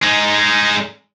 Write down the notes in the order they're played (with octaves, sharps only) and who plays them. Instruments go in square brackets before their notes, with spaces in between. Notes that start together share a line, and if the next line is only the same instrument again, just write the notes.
[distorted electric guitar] G#3 D#4